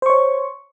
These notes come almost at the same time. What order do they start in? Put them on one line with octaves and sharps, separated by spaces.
C5 C#6 C#5